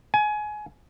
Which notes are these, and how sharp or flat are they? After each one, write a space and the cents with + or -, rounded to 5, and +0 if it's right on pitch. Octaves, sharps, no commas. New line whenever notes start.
G#5 +25